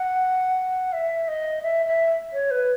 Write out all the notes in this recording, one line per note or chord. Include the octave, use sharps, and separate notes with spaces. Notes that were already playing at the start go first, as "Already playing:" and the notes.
Already playing: F#5
E5
D#5
E5
E5
C#5
B4